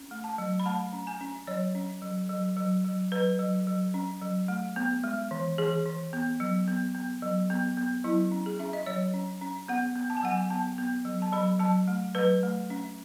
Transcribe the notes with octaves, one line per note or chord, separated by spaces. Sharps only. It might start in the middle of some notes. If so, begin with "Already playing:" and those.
Already playing: C#4
A3
A5
F#3
B5
A3 A5
C#4
G#5
C#4
F#3 C#5
C#4
F#3
F#3
F#3
F#3
F#3 B4
F#3
F#3
C#4
F#3
A3
B3
G#3
E3
E3 G#4
E3
B3
F#3
B3
B3
F#3
B3
B3
F#3 E4
C#4
G#4
C#4 E5
D#5
F#3 C#5
C#4
C#4
B3 F#5
B3
A5
G#5
F#3 F#5
G#5
B3 A5
B3
F#3
A5
F#3 B5
F#3 A5
A3
F#3 B4
A3
C#4